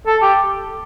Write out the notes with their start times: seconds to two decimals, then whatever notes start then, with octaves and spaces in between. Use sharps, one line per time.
0.07 A4
0.22 G4